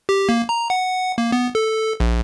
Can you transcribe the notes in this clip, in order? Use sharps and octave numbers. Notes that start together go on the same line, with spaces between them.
G4
A#3
A#5
F#5
A#3
B3
A4
A#1